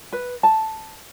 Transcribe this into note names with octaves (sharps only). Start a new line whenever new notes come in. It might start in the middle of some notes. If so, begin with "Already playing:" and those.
B4
A5